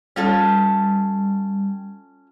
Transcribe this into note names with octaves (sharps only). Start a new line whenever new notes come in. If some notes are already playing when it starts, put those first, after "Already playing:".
G3 C#4 F4 A4